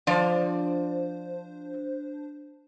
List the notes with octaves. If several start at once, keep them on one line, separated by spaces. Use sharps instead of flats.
F3 D4 C5 D5